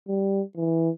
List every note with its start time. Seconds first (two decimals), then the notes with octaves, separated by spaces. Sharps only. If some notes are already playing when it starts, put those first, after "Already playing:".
0.08 G3
0.56 E3